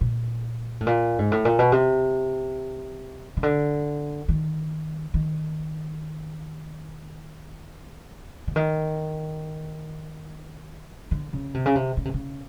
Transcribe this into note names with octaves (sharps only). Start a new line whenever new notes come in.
A#2
A2
A#2
G#2
A2
A#2
B2
C3
C#3
D3
D#3
D#3
D3
D#3
D3
C#3
C3
C#3
C3
C#3
C3
C#3